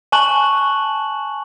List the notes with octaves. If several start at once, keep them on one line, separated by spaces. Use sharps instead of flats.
G#5 A5 C#6 F#6 F#7